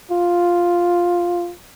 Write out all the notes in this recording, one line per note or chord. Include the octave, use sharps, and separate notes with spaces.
F4